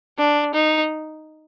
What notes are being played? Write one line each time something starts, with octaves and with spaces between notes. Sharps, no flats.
D4
D#4